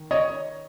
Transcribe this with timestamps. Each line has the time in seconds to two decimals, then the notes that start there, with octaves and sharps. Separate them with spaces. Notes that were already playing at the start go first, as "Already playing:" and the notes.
Already playing: D#3
0.11 C#5 D#5